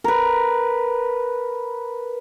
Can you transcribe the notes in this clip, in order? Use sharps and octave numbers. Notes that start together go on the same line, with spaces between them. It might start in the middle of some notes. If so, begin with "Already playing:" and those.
A#4 B4